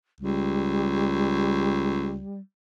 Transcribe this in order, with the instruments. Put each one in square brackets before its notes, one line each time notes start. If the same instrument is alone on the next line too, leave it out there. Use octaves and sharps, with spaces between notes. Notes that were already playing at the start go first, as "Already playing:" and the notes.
[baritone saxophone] C#2 [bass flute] G3